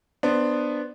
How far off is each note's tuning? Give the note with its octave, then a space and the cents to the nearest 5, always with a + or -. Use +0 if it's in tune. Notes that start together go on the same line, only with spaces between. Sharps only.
B3 +0 D4 +15 C5 +0